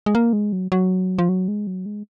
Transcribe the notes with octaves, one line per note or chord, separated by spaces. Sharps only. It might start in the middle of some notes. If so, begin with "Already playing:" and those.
G#3
A#3
G#3
F#3
F#3
F3
F#3
G#3
F#3
G#3